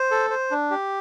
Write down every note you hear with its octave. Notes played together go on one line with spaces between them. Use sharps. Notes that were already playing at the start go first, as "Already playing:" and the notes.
Already playing: C5
A4
C5
D4
G4